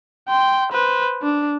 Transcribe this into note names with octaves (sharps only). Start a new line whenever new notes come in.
G5 C6
B4 C5
D4